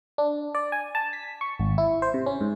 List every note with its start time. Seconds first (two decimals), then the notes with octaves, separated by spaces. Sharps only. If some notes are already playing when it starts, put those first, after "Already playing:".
0.18 D4
0.55 D5
0.72 G#5
0.95 A5
1.13 B6
1.41 C#6
1.60 G#1
1.78 E4
2.02 C5
2.14 C3
2.26 C#4
2.41 G#2